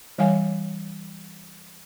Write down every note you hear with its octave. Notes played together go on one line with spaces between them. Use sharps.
E3 G3 C#5 F5 G#5